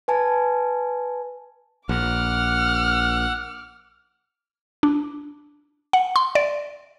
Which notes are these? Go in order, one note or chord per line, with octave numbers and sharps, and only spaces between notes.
B4 G#5 A5
A#1 F#5 D6 F6
D4
F#5
C6
D5